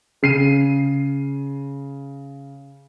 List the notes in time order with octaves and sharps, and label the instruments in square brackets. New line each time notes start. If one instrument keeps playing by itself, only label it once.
[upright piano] C#3 C7 D#7